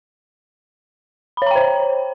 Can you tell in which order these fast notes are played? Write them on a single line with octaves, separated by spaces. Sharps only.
B5 C#5 A#5 G5 C5